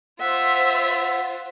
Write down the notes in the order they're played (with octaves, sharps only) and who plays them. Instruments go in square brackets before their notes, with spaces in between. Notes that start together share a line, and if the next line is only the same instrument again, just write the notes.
[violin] F4 C5 [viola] E5 [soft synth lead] F#5